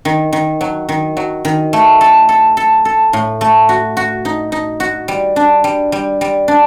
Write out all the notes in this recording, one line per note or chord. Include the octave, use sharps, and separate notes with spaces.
D#3
D#3
F#3
D#3
F#3
D#3
A3
A4
A4
A4
A4
A2
A3
F#4
F#4
D#4
D#4
F#4
G3
D4
G3
G3
G3
D4